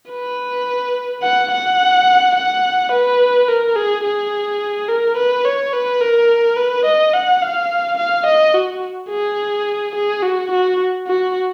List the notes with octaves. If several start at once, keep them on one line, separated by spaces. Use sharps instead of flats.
B4
F#5
F#5
F#5
B4
A#4
G#4
G#4
A#4
B4
C#5
B4
A#4
B4
D#5
F#5
F5
F5
D#5
F#4
G#4
G#4
F#4
F#4
F#4